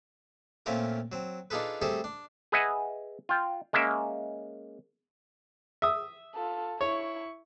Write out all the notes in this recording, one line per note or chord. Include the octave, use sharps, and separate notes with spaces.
A#2 A3 C4 C#4 F4 A#4
F#3 C4
D4 D#4 F4 G#4 A4 B4
G3 A3 C4 G#4 A4 C5
D4
G#4 B4 D#5 E5 F#5 G#5
F4 G5
G#3 A#3 C#4 E5
E5 D#6
F4 A4
E4 C#5 C#6